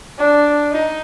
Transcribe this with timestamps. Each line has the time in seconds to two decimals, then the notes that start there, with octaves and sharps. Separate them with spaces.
0.19 D4
0.72 D#4